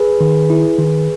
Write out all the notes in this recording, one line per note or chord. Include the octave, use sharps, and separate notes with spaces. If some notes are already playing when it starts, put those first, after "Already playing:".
Already playing: G#4 B4
D#3
E4
D#3